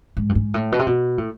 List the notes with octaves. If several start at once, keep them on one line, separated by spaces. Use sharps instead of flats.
G#2
G2
G#2
A2
B2
C3
B2
A2